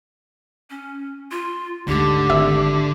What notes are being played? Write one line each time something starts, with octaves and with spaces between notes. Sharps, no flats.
C#4
F4
D2 G#2 D3 G4
G#1 E5 E6